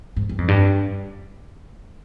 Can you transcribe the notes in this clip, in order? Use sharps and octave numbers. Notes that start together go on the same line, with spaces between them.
G#2
G2
F2
G2